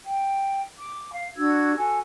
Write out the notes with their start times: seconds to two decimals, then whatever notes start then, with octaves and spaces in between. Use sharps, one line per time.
0.05 G5
0.78 D6
1.14 F5
1.36 D4 F#4 E6 G#6
1.77 F#4 A4 G#5